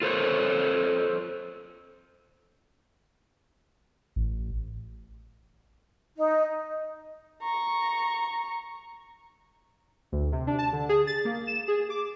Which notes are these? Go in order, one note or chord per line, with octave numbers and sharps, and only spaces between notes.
F4 A4 C5 C#5
A1
D#4
A#5 C#6
D2
C3
D4
A5
D3
G#4
A6
A#3
E7
G#4
D6